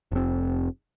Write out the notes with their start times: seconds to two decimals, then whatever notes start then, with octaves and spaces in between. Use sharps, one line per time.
0.12 F1 C4